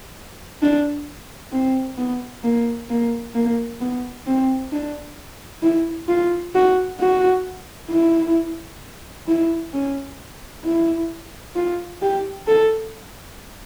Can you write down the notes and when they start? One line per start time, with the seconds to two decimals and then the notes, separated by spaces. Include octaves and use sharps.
0.62 D4
1.52 C4
1.98 B3
2.43 A#3
2.90 A#3
3.34 A#3
3.80 B3
4.27 C4
4.72 D4
5.62 E4
6.08 F4
6.55 F#4
7.00 F#4
7.90 E4
9.28 E4
9.73 C#4
10.64 E4
11.56 F4
12.02 G4
12.47 A4